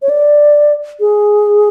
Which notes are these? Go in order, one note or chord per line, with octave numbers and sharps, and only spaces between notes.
C#5
D5
G#4